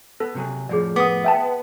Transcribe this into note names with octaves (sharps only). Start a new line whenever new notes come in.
B3 A4
C3 F#3 G#4
F2 A2 F3 G#4 D5
B3 D6 D#6
E5 G5 A5